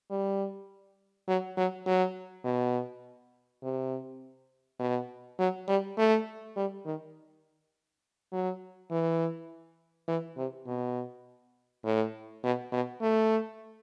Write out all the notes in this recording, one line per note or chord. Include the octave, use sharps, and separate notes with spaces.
G3
F#3
F#3
F#3
B2
C3
B2
F#3
G3
A3
G3
D#3
F#3
E3
E3
C3
B2
A2
B2
B2
A3